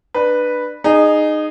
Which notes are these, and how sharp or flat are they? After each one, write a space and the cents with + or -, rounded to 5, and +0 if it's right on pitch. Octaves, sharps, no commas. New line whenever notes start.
D4 +30 B4 -5
D#4 -20 G#4 +0